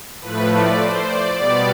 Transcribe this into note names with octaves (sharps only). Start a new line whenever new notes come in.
A2 F3 A3 B4
D5
C5
D5
B2 G3 B3 D5